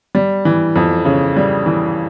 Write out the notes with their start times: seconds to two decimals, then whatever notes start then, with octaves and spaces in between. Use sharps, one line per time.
0.15 G3
0.45 E3
0.76 F2
1.05 C#3
1.37 G3
1.66 E3